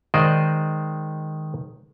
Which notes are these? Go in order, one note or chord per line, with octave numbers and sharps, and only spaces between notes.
D#3 G#3 C5 D5 D#5